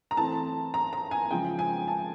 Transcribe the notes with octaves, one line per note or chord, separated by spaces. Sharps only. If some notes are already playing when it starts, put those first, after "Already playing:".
A#5
E3 A3 C4 A5
A#5
A#5
G#5
C#3 F3 G#3 G5
G#5
A5